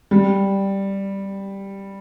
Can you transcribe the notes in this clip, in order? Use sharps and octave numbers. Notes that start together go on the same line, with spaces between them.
G3